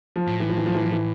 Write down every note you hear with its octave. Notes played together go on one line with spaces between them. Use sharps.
F3
A2
E3
F3
E3
F3
E3
F3
E3